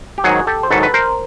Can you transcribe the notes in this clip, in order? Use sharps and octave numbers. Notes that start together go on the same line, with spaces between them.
G4
G#2 D#3 F#3 F#4 G#4
G4 A4
C5
G#2 D#3 F#3 A4 B4
B4
A#4 C5